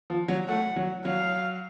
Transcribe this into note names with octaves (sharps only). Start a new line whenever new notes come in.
F3
F#3
A3 F#5
F#3
F#3 F5